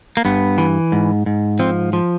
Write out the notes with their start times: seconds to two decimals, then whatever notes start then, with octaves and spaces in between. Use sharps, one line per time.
0.17 A#3
0.25 G2 B3
0.58 E3
0.92 G#2
1.26 G#2
1.59 F3 C4
1.93 F3